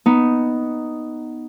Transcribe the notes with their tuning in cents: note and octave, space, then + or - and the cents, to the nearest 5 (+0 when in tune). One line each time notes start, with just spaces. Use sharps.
B3 +0 D#4 +0